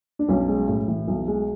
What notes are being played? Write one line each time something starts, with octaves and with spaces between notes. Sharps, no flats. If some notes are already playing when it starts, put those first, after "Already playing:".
D4
B1 C#4
G#3
A2
E3
B1
G#3